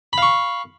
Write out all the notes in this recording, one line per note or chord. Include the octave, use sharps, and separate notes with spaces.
F5 B5 C#6